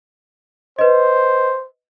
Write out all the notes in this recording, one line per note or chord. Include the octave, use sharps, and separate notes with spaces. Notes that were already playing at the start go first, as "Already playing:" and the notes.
B4 C5 D#5